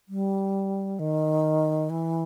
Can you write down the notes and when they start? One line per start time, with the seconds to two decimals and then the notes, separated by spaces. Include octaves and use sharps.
0.08 G3
0.99 D#3
1.90 E3